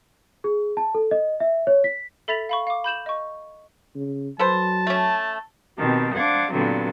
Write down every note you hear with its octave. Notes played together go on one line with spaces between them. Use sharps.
G#4
A5
A4
D#5
E5
C#5
B6
A4 E5 B5 A6 B6 F7
F5 B5 C#6
F5 D6
B5 G6 E7 F#7
D#5 C#6
C#3
F#3 A4 B4 C5 A5
A3 C#4
B2 D#3 C4 G4 A5
D4 C5 F5 F#5 D6 G#6
G2 A#2 D3 F#3 B3 C4